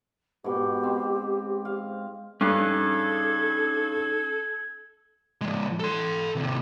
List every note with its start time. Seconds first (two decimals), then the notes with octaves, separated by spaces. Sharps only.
0.44 G#2 B2 G4
0.83 C4
1.65 F5
2.41 G2 C#4 D#4 G#4 A4 G#6
5.41 F3 G#3
5.80 A4 C6
6.35 D#2 C3